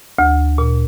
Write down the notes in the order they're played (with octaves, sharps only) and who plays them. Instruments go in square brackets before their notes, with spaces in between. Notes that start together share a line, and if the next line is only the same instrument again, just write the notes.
[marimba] D2
A#2